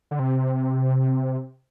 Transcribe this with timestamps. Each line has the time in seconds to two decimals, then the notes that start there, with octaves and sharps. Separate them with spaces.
0.11 D3
0.19 C3